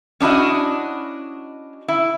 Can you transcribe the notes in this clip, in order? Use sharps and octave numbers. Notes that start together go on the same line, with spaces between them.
C#4 D4 E4 F#4 D#5
E4